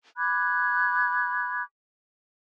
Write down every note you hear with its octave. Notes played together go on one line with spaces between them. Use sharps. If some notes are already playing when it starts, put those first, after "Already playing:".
B5 D6 F#6 G#6